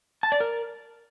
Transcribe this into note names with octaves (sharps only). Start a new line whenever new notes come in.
A5
D5
A#4